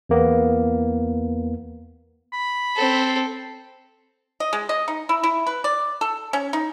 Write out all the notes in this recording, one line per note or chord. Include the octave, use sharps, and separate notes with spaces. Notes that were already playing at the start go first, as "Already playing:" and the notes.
E2 A#3 B3
B5
C4 A4
D#5
G#3
D#5
D#4
E4
E4
B4
D5
A4
C#4
D#4